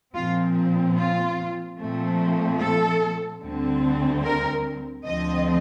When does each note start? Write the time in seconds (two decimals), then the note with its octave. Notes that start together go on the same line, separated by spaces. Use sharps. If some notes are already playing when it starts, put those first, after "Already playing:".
0.14 A#2 F3 C4 F4
0.97 F4
1.78 A#2 F3 A3 C4
2.59 A4
3.41 D2 D3 G3 C4
4.23 A#4
5.05 D2 D3 F3 C4 D#5